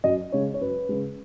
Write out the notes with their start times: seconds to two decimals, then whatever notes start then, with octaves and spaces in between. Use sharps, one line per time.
0.04 F#2 D#5
0.32 C#3 G#3 C#5
0.54 C#5
0.61 F#2 B4
0.89 C#3 G#3